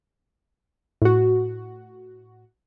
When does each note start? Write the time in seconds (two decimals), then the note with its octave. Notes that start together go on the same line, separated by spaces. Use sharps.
1.02 A2 F#4